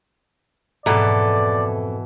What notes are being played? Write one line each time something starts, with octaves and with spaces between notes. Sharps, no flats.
F2 G#2 B2 E3 A4 D5 A#5